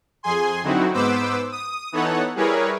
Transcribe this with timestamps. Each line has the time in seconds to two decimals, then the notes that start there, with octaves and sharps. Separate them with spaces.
0.23 F2 G#4 G#5 C6
0.63 D3 F#3 C4 D#4 E4 F#4
0.94 G#2 B3 B4 C5 D6 E6
1.52 D#6
1.92 E3 B3 D#4 A4 C#5 F#5
2.36 G3 E4 G#4 A#4 B4 C#5